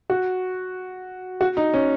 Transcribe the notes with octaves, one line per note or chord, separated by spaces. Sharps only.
F#4
F#4
D#4
C#4